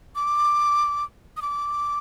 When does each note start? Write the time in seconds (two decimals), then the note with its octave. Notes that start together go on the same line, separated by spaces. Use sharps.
0.15 D6
1.37 D#6
1.42 D6